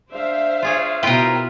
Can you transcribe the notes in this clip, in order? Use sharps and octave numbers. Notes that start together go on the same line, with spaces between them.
D4 C5 E5 F5
F4 G#4 C#5
B2 E4 F4 A#4 B4 G5